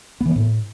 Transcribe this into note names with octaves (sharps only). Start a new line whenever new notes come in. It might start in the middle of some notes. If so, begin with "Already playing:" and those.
B3
E3
B3
A2